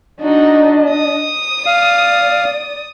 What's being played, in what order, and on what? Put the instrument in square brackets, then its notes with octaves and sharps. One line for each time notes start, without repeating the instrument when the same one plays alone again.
[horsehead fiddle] D4 D#5 [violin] D#4 F#4
[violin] D#6
[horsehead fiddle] D5 [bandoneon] F5